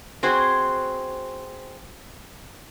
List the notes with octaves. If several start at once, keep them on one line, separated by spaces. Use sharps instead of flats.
C4 F#4 G#4 C5